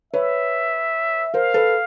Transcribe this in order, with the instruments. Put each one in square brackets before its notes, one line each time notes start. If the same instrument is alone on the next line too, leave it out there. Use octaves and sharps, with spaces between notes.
[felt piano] B4 C#5 [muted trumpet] E5
[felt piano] A#4 C5 [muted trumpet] F5
[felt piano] A4 B4